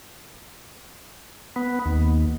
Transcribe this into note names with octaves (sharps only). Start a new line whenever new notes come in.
B3
D#2